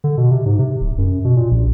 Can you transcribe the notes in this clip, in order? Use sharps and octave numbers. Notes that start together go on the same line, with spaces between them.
D3
B2
C3
G#2
C3
D1
F#2
B2
A#2
A#1